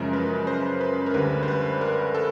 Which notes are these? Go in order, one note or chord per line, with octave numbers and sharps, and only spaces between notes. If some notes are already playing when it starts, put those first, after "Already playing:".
Already playing: F#2 C#3 F3 G#3 A#4
B4
C5
B4
A#4
D2 D3 G3 B4
C5
B4
A#4
A4